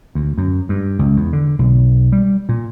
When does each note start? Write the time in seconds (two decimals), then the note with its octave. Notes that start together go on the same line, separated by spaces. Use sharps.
0.15 D2
0.38 F#2
0.69 G2
0.99 C#2
1.16 E2
1.33 D3
1.59 B1
2.12 G3
2.49 A#2